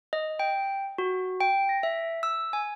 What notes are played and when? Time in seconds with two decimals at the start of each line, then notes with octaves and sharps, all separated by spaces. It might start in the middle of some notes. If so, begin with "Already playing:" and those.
0.13 D#5
0.39 G5
0.98 F#4
1.41 G5
1.69 A#6
1.83 E5
2.23 E6
2.53 G#5